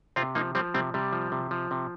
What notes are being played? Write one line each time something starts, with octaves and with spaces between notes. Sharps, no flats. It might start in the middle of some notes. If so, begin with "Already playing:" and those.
C3 C4 F4
F3 A#3 D#4
F3 G3 C4
C3 G3 C4
C3 G3
F3
C3
F3
C3